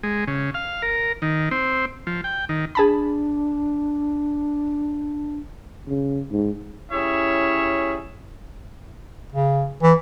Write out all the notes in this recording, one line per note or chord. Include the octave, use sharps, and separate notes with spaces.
G#3
C#3
F5
A#4
D#3
C4
F3
G5
D#3
D4 G#4 A5 B5
C#3
G#2
G3 C#4 E4 G#4 C#5 E5
C#3
E3